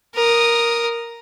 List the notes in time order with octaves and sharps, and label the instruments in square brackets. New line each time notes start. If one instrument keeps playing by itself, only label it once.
[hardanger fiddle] A#4 D#6